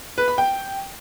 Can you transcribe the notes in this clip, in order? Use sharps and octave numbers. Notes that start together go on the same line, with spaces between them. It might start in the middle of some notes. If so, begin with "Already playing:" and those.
B4
B5
G5